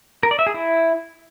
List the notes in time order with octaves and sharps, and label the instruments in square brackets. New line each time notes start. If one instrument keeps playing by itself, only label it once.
[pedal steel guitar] A#4
D5
E5
G#4
E4